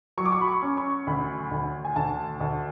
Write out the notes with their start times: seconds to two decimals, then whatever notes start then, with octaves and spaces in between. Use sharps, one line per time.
0.17 F#3 C#6
0.25 D6
0.32 C#6
0.41 B5
0.48 C#6
0.62 C#4
0.77 C#6
1.07 D2 B5
1.51 D2
1.85 G#5
1.96 D2 A5
2.41 D2